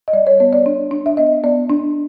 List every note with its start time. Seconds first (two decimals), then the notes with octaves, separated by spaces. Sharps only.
0.08 D#5
0.13 G3 D5
0.27 C#5
0.40 B3 C#5
0.53 D5
0.66 D4
0.91 D4
1.06 E5
1.17 B3 D#5
1.43 B3 D5
1.70 D4